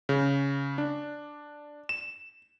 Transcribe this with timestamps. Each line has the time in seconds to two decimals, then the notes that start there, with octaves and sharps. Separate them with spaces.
0.09 C#3
0.78 D4
1.89 E7